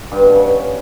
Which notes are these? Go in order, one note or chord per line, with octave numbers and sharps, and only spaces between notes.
G2
B2
C#3